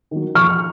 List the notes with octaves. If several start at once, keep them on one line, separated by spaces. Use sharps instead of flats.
D#3 F#3
F2 C#6 F6